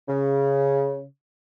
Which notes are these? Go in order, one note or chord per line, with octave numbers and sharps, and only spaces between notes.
C#3